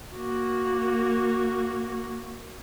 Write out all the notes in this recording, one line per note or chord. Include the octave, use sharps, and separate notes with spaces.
A#3 F#4